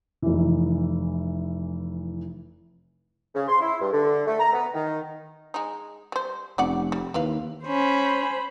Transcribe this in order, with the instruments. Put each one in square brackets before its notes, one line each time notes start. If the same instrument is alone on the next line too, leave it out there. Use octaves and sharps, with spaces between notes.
[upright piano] F1 E3
[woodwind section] C#3
C6
E4
G2
D3
A3
A#5
B3
D#3
[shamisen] G#3 D#4
G3 C5
[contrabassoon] F1 [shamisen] C#4 D5 F#5
[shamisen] G3
[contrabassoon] D#2 [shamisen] E4 B4 F5
[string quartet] C#4 [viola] C5 B5